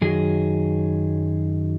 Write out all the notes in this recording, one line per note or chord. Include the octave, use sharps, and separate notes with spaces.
F#2 D#3 F#3 G#4